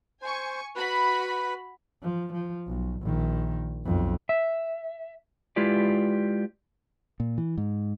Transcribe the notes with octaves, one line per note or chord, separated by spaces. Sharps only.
C5 G#5 C#6
F#4 B4 B5
F3
F3
B1
A#1 D#3
B1 F2
E5
G#3 E4 F4 G4 B4 D5
A#2
E3
G#2